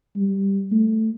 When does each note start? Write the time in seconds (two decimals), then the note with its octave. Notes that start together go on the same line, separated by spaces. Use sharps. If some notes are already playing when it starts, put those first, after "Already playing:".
0.16 G3
0.72 A3